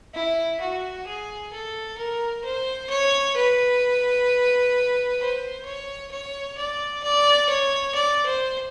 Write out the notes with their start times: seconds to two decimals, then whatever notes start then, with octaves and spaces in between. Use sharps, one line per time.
0.14 E4
0.60 F#4
1.07 G#4
1.52 A4
1.97 A#4
2.44 C5
2.89 C#5
3.36 B4
5.20 C5
5.65 C#5
6.11 C#5
6.58 D5
7.03 D5
7.49 C#5
7.94 D5
8.26 C5